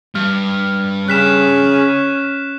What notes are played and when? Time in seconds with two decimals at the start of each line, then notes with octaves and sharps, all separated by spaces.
0.15 G2 F6
1.08 C#3 C#4 F#6 B6 E7